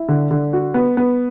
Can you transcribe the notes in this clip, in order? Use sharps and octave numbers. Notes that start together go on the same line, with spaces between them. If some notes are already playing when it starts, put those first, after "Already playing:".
Already playing: E4
D3
D3
F#4
B3
B3